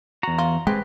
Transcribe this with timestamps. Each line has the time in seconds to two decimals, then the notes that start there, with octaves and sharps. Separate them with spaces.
0.23 E2 F#4 A#5
0.38 F4
0.67 G#3 C4 G4 B4